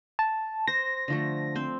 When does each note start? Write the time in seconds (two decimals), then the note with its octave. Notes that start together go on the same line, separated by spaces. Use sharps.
0.19 A5
0.67 C5 A#6
1.08 D3 F3 A3
1.55 C4 C5